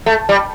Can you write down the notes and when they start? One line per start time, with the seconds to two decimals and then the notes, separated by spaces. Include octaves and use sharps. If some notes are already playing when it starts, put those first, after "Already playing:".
0.06 A3
0.29 G3